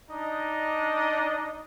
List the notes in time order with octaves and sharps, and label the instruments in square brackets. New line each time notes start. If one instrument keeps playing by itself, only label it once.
[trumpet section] D4 D#4 D#5